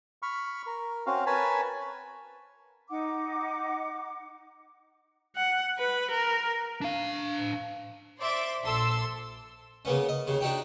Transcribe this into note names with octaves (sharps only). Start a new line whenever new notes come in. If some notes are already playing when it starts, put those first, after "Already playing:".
B5 C#6 F6
A#4
C4 C#4 F#4 F5
A#4 B4 C#5 G#5 A5 B5
D#4 F#5 D6
F#5
B4
A#4
D4 F5
C5 D5 E5 C6 D6
A#1 A4 C6 E6
C#3 A#3 B3 C#4
D#5
D#2 C#3
D4 D#4 F#4 G4